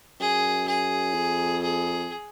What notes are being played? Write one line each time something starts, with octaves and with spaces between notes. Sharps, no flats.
F#2 G#4
G#4
F2
G#4